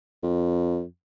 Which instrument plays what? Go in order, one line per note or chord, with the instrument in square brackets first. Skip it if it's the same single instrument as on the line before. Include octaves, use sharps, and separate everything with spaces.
[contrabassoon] F2